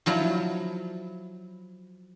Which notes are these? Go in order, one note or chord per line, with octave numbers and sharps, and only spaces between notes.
F3 F#3 E4